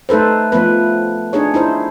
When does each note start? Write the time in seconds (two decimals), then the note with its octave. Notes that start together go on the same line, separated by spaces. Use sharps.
0.09 A3 D#4 A4 B4 C5
0.52 F3 A3 B3 B4
1.33 D4 D#4 G#4 C#5
1.54 D#4 E4 C5